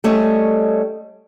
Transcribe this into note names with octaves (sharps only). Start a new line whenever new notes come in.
G3 A3 C#4 C#5 D#5